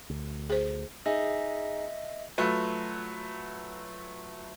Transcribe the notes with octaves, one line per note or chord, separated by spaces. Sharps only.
D2
G#4 C5
D#4 G#4 D#5 E5
F#3 A3 F4 B4